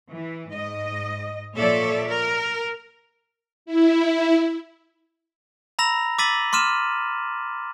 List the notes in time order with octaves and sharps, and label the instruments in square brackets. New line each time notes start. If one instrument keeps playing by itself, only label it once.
[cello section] E3
G#2 D#5
A#2 F3 A4 C#5 D5 E5
A#4
[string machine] E4
[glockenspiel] A#5 B5 E6 A#6 F7
D6 E6 A6 B6 D#7 F#7
C6 D6 F6 D#7 E7